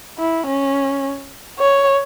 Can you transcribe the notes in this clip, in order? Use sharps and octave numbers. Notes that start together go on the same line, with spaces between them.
E4
C#4
C#5